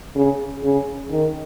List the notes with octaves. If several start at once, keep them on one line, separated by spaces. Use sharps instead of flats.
C#3
C#3
D#3